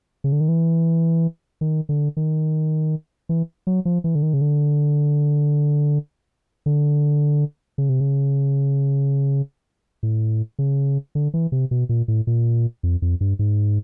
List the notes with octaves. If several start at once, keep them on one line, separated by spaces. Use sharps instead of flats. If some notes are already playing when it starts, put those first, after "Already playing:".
C#3
D3
D#3
E3
D#3
D3
D#3
E3
F#3
F3
E3
D3
D#3
C#3
D3
D3
C#3
C3
C#3
A2
C#3
D3
E3
C3
B2
A#2
A2
A#2
F2
F2
G2
G#2